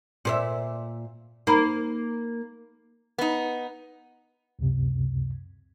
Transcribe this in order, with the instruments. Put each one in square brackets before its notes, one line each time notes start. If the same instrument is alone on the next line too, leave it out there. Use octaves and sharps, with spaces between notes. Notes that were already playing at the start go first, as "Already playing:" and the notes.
[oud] A#2 C5 E5
[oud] A#3 [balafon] D#4 A#5 B5
[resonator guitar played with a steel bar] B3 D#4
[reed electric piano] C#2 F#2 C3